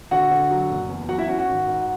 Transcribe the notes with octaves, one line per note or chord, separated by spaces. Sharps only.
D3 F#4 F#5
D3
F#3
F#1
E2
F#3 F#4 F#5
E4 E5
C#4 F#4
F#4
G#1
G#2